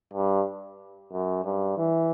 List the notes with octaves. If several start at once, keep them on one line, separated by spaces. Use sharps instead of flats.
G2
F#2
G2
E3